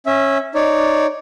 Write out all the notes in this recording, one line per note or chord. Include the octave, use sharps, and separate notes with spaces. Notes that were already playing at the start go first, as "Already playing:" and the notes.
C#4 E5
D#4 C#5 D5